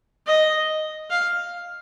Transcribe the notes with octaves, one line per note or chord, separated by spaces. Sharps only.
D#5
F5